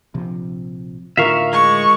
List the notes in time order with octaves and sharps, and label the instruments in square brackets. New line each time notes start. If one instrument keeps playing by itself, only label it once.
[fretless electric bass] A#1 C3 F3
[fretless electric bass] A2 D3 D#3 [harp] F4 A#4 [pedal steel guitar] E5 F5 C#6
[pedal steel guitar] G#3 [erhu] C#6